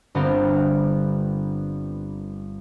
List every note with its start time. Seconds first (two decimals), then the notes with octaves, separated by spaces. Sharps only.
0.15 G1 D3 B3 C4 G4 A#4